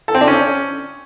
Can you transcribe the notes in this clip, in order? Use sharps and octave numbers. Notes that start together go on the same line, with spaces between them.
A4
C4
D4
C#4